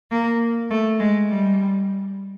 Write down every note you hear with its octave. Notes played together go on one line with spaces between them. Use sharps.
A#3
A3
G#3
G3